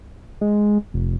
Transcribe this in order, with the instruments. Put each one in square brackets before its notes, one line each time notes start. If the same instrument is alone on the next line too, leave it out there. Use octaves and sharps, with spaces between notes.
[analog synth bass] G#3
F1